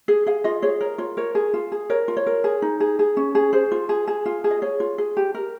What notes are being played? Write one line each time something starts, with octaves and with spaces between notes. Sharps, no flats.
G#4
G#4 F5
F4 D#5
G#4 C#5
A#4 C#5
F4 C#5
A#4 C#5
G#4
F4
G#4
A#4 C#5
F4
C#5
A#4
G#4
D#4
G#4
G#4
C#4
G#4
G#4 C5
F4
G#4
G#4
F4
G#4
D#5
G#4 C#5
F4
G#4
G4
A#4